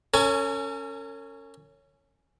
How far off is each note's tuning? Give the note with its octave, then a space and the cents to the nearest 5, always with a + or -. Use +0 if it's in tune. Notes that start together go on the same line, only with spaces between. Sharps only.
C#4 +0 A#4 -45 G#5 +20